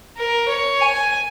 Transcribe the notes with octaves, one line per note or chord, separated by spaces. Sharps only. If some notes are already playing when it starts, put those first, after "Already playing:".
A#4
C#5
G#5